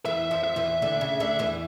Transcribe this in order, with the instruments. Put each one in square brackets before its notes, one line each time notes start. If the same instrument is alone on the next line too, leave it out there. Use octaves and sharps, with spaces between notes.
[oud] E2 E3 [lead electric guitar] E5
[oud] F2 F3
[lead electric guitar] E5
[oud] E2 E3
D2 D3
C#3
D2 D3
E2 E3